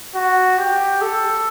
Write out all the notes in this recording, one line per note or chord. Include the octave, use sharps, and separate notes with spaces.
F#4
G4
A4